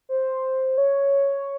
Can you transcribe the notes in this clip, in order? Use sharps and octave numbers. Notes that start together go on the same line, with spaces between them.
C5
C#5